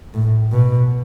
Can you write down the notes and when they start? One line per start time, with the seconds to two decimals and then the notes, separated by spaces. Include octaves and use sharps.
0.14 A2
0.52 B2